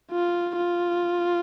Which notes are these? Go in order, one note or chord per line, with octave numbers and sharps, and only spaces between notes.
F4
F4